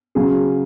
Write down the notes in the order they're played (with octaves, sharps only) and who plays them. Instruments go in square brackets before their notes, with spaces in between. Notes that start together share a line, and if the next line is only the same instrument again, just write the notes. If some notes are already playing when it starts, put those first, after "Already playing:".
[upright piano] C#3 F#3 G#4